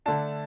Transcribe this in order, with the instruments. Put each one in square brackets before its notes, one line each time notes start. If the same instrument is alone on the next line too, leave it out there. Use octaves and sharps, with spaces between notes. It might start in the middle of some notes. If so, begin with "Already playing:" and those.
[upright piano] D3 A3 D4 A5